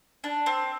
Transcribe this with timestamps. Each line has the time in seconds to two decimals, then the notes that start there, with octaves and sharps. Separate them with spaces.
0.24 D4
0.46 C4